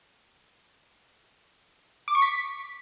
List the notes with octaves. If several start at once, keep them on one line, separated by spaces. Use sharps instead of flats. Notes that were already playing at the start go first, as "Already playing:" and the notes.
D6
C#6
B6